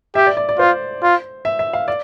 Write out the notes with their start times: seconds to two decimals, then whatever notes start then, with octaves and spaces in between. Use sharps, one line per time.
0.15 G4 E5
0.27 D5
0.37 D5
0.49 D5
0.59 F4 C5
1.02 F4
1.45 E5
1.59 E5
1.73 F5
1.88 D5